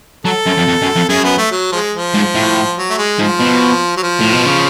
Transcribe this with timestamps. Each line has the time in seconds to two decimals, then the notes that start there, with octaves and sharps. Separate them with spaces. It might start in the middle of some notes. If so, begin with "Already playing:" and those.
0.25 F#3 A4
0.46 F#2
0.57 F2
0.68 F2
0.82 F#2
0.96 F2
1.09 F#2 G#4
1.24 B3
1.38 A3
1.51 F#3
1.72 F3 G#3
1.94 F3
2.14 G#2
2.35 A2
2.77 F#3
2.90 A3
2.98 G#3
3.19 G#2 F3
3.40 B2
3.97 F#3
4.03 F3
4.20 A2
4.33 B2
4.45 C#3